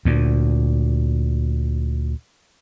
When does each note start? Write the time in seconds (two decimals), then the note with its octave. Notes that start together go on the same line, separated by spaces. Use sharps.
0.05 D2 A#2